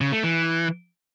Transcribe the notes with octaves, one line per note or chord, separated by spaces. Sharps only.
C#3
A3
E3